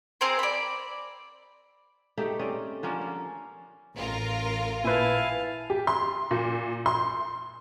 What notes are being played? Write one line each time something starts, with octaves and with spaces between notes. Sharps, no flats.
C4 G#4 A#4 C5
D5 B5
A3 D#4 G4
C4 C#4 D5 D#5
D3 F3 A#3 C#4
A#3
A1 F4 A#4
A#2 E4 B4 F5 G#5 A5
G4
C6
A#2
C6